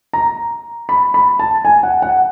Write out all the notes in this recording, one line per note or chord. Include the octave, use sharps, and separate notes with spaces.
A#5
B5
B5
A5
G#5
F#5
F#5